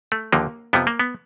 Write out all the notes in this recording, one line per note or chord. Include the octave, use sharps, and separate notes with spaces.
A3
D#2 D3 F3 A#3
F2 C3 F3 B3
A#3
B3